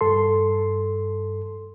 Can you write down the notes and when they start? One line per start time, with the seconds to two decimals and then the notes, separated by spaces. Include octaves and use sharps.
0.01 G2 A4 C6